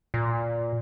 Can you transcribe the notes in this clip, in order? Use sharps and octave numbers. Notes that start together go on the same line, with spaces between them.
A#2